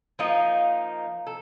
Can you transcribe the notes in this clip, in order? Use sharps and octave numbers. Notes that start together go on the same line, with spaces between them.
F3 A#3 D#4
A4